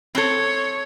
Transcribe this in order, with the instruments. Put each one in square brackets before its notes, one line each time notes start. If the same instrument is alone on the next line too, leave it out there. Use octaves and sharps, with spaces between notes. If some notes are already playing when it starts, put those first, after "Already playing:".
[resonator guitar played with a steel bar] C4 A4 [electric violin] C#5